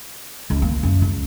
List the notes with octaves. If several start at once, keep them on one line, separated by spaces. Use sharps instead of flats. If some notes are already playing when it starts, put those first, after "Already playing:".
C#2
A#3
F#2
C#2